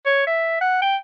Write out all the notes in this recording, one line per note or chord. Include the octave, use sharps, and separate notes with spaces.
C#5
E5
F#5
G5